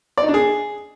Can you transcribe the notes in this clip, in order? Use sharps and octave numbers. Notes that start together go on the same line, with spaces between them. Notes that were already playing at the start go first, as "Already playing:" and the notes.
D5
D#4
D4
G#4